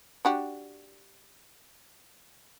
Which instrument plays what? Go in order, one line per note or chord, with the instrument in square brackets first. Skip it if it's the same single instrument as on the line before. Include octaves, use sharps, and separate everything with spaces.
[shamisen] D4 F#4 G4